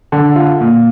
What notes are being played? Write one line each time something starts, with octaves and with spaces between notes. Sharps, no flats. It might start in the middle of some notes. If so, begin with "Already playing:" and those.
D3
F4
A#2